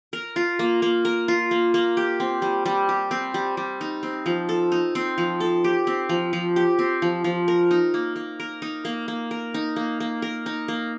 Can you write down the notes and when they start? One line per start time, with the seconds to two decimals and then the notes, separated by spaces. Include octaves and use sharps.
0.13 A#4
0.36 F4
0.59 A#3
0.82 A#3
1.05 A#4
1.28 F4
1.51 A#3
1.74 A#3
1.97 G4
2.20 C4
2.42 G3
2.66 G3
2.89 G4
3.11 C4
3.34 G3
3.57 G3
3.81 D#4
4.03 C4
4.26 F3
4.49 A4
4.72 D#4
4.95 C4
5.18 F3
5.40 A4
5.64 G4
5.87 C4
6.09 F3
6.33 F3
6.56 G4
6.79 C4
7.02 F3
7.24 F3
7.48 A#4
7.71 D#4
7.94 A#3
8.16 A#3
8.40 A#4
8.62 D#4
8.85 A#3
9.08 A#3
9.31 A#4
9.54 D#4
9.76 A#3
10.00 A#3
10.22 A#4
10.46 D#4
10.68 A#3